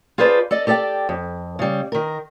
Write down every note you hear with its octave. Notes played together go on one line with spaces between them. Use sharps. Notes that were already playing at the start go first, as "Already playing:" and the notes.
F4 G#4 A4 B4 C5 D5
A4 D5 D#5
G4 A4 D5 F#5 G5
F2
C#3 G3
D#3 A#4